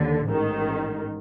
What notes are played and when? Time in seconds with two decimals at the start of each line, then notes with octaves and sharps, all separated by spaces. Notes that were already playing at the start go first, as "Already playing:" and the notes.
Already playing: D#2 D3
0.26 A1 G#2 D#3